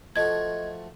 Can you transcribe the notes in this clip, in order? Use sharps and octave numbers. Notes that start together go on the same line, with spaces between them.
F3 A3 F#4 D#5 G#6